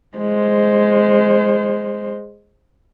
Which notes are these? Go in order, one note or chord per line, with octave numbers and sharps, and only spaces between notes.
G#3 C5